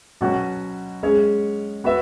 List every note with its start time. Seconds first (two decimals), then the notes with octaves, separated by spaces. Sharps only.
0.21 B2 F#3 C#4 F#4
1.03 G#3 C#4 G#4 C#5
1.84 B3 F#4 B4 E5